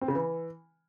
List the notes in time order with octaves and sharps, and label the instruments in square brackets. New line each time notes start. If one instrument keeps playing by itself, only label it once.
[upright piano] C4
C#3
E3